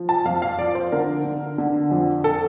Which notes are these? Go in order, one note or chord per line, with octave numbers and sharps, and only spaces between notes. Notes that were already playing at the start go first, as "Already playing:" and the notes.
Already playing: F3
A5
F2 F5
F5
F3 D5
C5
D3 A#4
D3
D3
F2
A4